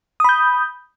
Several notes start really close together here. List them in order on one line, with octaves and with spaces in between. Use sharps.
D#6 B5 G6